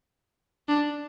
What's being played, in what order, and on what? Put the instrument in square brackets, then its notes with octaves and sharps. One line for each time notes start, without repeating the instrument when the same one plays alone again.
[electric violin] D4